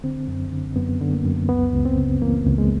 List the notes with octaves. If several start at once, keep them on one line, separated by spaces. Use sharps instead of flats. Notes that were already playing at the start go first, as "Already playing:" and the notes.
D3 C4
F#2
D3
F#2 B3
D3
A#3
F#2
C#2 B3
C#2
C4
C#3
E3 A#3
C#2
G#3